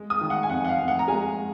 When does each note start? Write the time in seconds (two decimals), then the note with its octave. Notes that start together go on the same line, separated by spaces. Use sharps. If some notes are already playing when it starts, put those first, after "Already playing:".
Already playing: G#3
0.10 D#6
0.21 D#3
0.30 F#5
0.43 G#5
0.50 F2 F#5
0.65 F#5
0.69 F5
0.79 F2
0.88 F#5
0.99 A#5
1.08 G#3 G#5